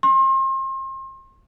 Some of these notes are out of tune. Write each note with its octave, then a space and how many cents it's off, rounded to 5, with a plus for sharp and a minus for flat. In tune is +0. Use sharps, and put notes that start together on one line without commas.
C6 +35